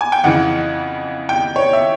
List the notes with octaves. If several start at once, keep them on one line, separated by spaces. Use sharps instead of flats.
G#5
G5
F2 C#3 E3 F#5
G5
C#5
E5